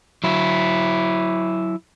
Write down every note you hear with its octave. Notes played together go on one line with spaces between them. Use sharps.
F#3 E4